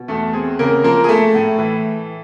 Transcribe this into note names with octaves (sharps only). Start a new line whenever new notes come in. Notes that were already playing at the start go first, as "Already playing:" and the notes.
Already playing: B2
E2 A3 A4
C4 G#4
C#3 A#3 A#4
F3 A#3 A#4
G#4
A3 A4
A2
E3